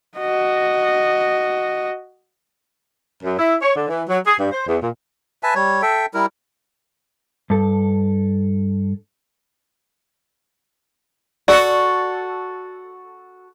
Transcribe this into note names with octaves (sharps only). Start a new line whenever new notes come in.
F#4 D#5
F#2
E4
C#5
D3
E3
F#3
G#4
G2
C5
E2
A#2
B4 E5 G#5 A5
G3 C#5
A4 E5 G5
G3 E4 A#4
G2 A4
F#4 A4 D5